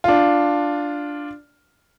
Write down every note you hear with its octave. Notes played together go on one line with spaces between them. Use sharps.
D4 F4